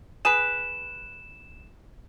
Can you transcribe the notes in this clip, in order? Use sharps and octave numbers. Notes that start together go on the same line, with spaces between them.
G#4 B4 E7